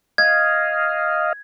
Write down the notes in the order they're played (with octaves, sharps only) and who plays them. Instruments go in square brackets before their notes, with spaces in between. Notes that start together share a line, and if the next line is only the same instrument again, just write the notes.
[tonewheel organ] D#5 F5 [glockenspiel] G#6